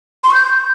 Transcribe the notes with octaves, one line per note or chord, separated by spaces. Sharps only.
C6
C#6
G6